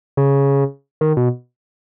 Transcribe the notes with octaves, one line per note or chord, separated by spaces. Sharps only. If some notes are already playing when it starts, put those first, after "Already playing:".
C#3
D#3
B2